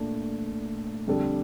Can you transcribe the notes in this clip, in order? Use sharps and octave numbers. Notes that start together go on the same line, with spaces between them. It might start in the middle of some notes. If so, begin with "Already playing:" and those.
Already playing: A#2 A3 D4
F2 D3 G3 D4 A4